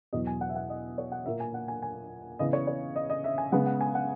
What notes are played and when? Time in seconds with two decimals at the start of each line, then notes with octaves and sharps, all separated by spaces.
0.13 E2 B2 F#3 D#5
0.27 G#5
0.41 F#5
0.49 E5
0.56 F#5
0.70 D#5
0.98 C#5
1.12 F#5
1.26 A#2 A#3 E5
1.40 G#5
1.54 F#5
1.68 G#5
1.82 G#5
2.39 C#3 E3 B3 D#5
2.53 C#5
2.67 C#5
2.96 D#5
3.10 D#5
3.24 E5
3.38 G#5
3.52 C#3 G#3 B3 F#5
3.66 F#5
3.81 G#5
3.95 F#5